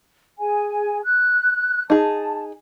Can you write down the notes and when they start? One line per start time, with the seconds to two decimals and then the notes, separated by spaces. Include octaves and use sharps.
0.39 G#4 G#5
1.04 F#6
1.90 D#4 G#4 A5